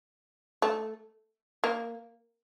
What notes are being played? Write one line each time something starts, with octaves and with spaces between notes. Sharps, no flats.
A3
A#3